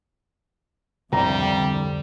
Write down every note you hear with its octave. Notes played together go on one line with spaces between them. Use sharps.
C2 F2 D3 G3 A#5